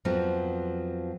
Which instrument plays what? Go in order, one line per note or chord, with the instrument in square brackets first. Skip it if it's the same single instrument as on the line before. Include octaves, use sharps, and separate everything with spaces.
[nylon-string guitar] F2 F3 F#3 B3